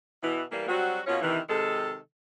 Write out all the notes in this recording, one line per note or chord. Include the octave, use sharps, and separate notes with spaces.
B2 E3
E3 G3 A#3
F#3 G3 C4 F#4
B2 A#3 C#4 F4 C#5
C3 D#3 E3
C3 D#3 G#3 A4